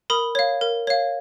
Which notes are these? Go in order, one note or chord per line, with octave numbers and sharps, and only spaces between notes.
A#4 B5 D#6
C#5 F5
A#4
C#5 F5